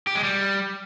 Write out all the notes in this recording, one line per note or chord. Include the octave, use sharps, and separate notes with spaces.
G4
G#3
G3